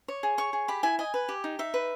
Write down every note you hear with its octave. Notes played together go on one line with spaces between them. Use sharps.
C#5
G#4
C#5 C#6
G#4
G4 B5
E4 G#5
D#5 G#5
B4
G4
D#4
D#4 E5
B4